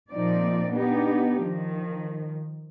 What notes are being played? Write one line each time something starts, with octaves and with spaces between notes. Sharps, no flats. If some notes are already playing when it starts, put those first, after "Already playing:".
A#2 F3 C4 D#4 D5
B3 D4 D#4 G4
D#3 F3